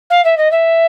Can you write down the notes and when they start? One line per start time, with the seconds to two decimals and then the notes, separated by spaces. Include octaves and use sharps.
0.10 F5
0.24 E5
0.37 D#5
0.51 E5